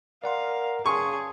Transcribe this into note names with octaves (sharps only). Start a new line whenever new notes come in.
A#4 D5 F5 F#5 C6
C#3 G#4 A5 C6 C#6